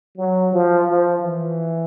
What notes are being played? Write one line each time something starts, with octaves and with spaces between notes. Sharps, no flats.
F#3
F3
F3
E3